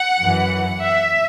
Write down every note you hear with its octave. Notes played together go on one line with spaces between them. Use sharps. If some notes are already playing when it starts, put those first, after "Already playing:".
Already playing: F#5
F#2 E3
E5